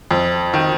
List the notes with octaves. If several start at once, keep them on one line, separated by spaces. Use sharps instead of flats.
F2
D#3